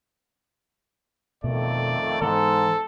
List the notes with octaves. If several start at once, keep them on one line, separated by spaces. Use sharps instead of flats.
F2 B2 D#3 A3 D5
G#2 E3 B3 A4